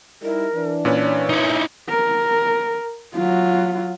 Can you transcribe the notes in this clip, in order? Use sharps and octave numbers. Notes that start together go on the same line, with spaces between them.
G3 D#4 E4 A#4
E3 D4
A#2 C#4 B4 C#5
D#4 E4
A#4
F#3 F4